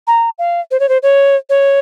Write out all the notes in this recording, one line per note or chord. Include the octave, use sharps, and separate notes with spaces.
A#5
F5
C5
C#5
C5
C#5
C#5